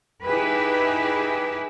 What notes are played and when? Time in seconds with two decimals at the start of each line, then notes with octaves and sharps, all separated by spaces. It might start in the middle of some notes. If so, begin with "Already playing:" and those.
0.24 D#4 E4 G4 G#4 B4 E5